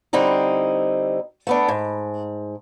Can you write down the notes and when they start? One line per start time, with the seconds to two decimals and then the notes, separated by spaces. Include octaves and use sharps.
0.13 D3 G3 C4 D#4 E4
1.47 A3 B3 D4
1.68 G#2